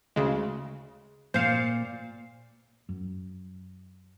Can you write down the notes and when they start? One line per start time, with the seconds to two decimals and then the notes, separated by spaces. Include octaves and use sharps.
0.16 D2 C#3 G#3
1.34 A#2 C5 F5
2.89 F#2